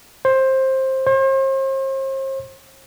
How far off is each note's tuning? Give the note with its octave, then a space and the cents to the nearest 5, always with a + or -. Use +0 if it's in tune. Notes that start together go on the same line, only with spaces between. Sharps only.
C5 +15
C5 +40